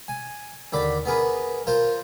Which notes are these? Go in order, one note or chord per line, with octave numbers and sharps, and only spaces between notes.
G#5
D#2 D3 D5 B5 D6
B3 G#4 A#4 B4
F4 A#4 C5